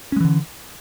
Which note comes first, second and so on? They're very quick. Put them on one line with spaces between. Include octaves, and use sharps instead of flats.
C#4 G#3 E3 D3